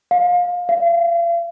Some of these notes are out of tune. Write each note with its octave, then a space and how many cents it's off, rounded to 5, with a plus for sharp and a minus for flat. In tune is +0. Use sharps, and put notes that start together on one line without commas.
F5 +25
F5 -40